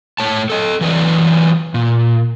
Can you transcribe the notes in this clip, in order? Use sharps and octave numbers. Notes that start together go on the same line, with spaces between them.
A2 C#5 A5
A4 D#5
E3 F#3 B4 D5
A#2